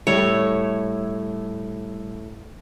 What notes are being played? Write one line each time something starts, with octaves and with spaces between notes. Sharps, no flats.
A2 G3 A3 C#5